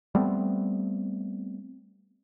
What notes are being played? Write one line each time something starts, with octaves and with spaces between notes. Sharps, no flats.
G3 A3 B3 C4